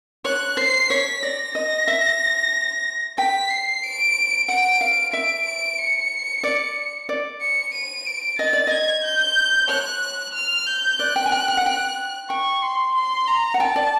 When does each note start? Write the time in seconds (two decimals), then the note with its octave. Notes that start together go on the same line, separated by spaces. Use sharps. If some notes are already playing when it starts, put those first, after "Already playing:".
0.25 C#5 F#6
0.57 C5 C7
0.90 C#5 B6
1.23 D5 A#6
1.55 D#5 A#6
1.88 E5
3.18 G5 B6
3.50 C7
3.83 D7
4.48 F#5 D7
4.81 F5
5.13 E5 D7
5.46 D7
5.78 C#7
6.44 D5
7.09 D5
7.41 C#7
7.74 D#7
8.06 D7
8.39 D#5 A6
8.53 D5
8.67 D#5 G#6
9.04 G6
9.69 C#5 F#6
10.34 F6
10.67 G6
10.99 D5 F#6
11.16 G5
11.26 G#5
11.32 G5
11.48 G5
11.57 F#5
11.66 G5
12.30 G5 C#6
12.62 C6
12.95 C6
13.27 A#5
13.54 F#5
13.60 G5 A5
13.76 D5